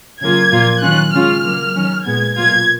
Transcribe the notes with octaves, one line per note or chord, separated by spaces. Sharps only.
C#3 F#3 A#3 F4 G#6
A#2 F3 A#3 F4
D#3 F#3 C#4 F4 F#6
C#3 G#3 C#4 F4 F6
C#3 F#3 A#3
D#3 F#3 C#4
A#2 G#3 B3 G#6
B2 F#3 A#3 F4 G#6